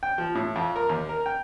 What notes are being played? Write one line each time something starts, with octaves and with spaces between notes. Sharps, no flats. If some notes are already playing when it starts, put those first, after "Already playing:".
G5
F3
A2
F2
A#4
D#2
A#4
G5